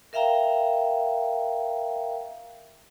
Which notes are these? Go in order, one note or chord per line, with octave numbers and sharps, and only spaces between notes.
A#4 E5 F5 G5 A#5